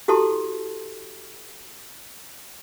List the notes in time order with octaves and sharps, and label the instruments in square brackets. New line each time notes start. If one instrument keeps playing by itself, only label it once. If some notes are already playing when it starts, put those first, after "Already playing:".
[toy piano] E4 F#4 G4 A4 A5 C6